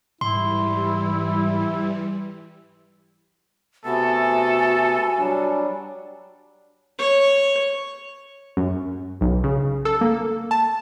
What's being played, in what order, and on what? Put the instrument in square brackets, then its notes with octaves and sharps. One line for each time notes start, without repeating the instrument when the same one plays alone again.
[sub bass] G#2 [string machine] E3 G3 [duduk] E4 [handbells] C6
[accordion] C3 A3 B3 [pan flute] F#4 [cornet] A4 [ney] G#5
[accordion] F#3 G3 D4
[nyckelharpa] C#5
[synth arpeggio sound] F#2
B1
C#3
A4
A#3
A5